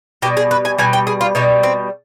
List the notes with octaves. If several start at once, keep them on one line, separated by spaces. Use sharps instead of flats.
B2 G3 G4
G#4
B4
G#5
B2 G3 G#5
G5
G#4
F4
B2 G3 D#4
C4